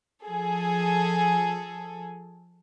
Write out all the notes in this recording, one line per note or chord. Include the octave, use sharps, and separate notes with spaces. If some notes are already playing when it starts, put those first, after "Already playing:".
F3 G#4 A4